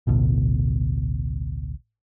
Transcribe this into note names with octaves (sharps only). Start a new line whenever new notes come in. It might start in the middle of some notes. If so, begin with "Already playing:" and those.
A1 D2 B2